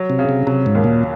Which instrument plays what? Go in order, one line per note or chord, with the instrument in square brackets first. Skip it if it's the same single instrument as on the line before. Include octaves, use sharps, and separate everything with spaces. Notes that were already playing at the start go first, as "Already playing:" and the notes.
Already playing: [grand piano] F#3
[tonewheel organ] C3
[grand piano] C#3
[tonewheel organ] C3
[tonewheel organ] C3 [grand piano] F#3
[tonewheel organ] G#2
[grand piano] D#2
[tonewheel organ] A#2